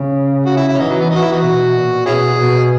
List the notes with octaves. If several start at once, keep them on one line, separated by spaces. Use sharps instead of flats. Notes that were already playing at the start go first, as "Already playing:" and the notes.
Already playing: C#3
F#4
E4
E4
C#4
E3 D#4
F#3
B3
E3 D#4
F#4
E4
B3 D#4 F#4
B2
A#2
B2 C#4 E4 G#4
B2